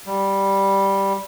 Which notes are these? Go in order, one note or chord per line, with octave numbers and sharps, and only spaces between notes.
G3